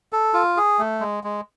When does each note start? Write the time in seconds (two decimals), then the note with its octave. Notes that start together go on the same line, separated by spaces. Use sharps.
0.13 A4
0.34 F4
0.57 G#4
0.79 A3
1.00 G#3
1.24 G#3